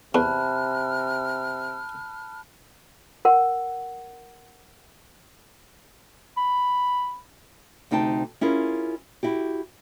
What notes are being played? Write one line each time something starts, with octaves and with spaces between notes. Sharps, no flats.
E2 C3 A5 B5 F6 F#6
A#4 F#5
B5
D2 C3 D#4 G5 A5
C#4 E4 F4 G#4 A#4
E4 F#4 G4